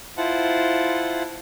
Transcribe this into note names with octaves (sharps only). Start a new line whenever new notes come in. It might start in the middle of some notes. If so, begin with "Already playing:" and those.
E4 F4 C5 F#5 A5